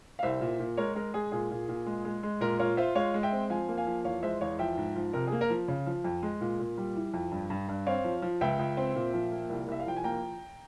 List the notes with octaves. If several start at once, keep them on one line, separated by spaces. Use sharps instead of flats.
F5
C2 C5 E5
A#2
A#2
G#3 A#4 C#5
G#3 A#4
G#3 G#4
A#2 G#4
A#2
A#2
G#3
G#3
G#3
A#2 A#4
F4 A#4 C#5
F4 C5 E5
G#3 C#5 F5
G#3
E5 G5
C4
F3 F5 G#5
A#3
F5 G#5
F3
E2 C#5 F5
G#3 C5 E5
E2 C#5 F5
F3 E5 G5
G#2
F3
C3 A#4
G#4
A#3
A#4
F3
C#3
F3
F2
G#3
A#2
A#2
G3
E3
F2
G2
G2
G2
C4 C#5 F5
F3
F3
C#2 E5 G5
C#2
C4
A#2
F3
A#3
C2
C2 E5
F5
F3 G5
G#5
A#3 G5 A#5